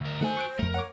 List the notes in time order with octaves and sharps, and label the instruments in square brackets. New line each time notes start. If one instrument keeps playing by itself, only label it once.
[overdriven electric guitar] D2 A#4
[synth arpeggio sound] D#3 A3 [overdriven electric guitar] F#4 G#5 [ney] C5
[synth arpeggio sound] C#6 F#6 D7
[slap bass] F2 A3 [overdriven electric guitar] A#4
[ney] C#5 [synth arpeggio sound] F#5 D6